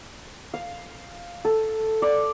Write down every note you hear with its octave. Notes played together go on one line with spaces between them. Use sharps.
F5
A4
D5